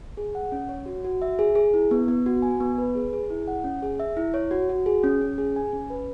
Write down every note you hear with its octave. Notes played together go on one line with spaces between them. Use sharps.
G#4
F#5
C#4
C#5
F#4
F#4
E5
G#4
G#4
E4
B3
B3
F#4
G#5
B3
B4
G#4
G#4
E4
F#5
C#4
G#4
E5
E4
C#5
F#4
F#4
G#4
C#4
C#4
G#4
G#5
C#4
B4